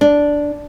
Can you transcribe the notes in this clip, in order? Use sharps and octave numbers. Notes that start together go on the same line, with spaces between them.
D4